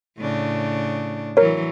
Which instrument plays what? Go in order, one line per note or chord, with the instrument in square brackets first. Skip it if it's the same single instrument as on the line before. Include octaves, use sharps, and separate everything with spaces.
[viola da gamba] A2 C#3 D4
[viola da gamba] E3 F#3 [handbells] A#4 C#5